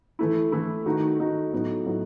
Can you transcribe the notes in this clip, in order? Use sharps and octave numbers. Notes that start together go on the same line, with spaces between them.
E3 A3 E4
E3 A3 E4
D#3 A3 D#4 F#4
D#3 A3 D#4 F#4
A2 F#3 B3 D#4 F#4
A2 F#3 B3 D#4 F#4